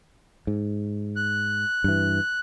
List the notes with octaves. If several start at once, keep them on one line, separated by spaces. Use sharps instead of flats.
G#2
F#6
G2 E3